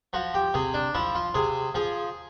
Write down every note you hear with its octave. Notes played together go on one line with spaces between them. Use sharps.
F3 F#4
G4
C3 G#4
D4
F3 E4
F4
C3 G#4
F3 G#4